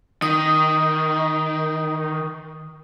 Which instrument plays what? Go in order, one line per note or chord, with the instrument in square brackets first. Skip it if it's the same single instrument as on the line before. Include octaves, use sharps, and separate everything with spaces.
[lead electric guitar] D#3 [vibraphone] D#6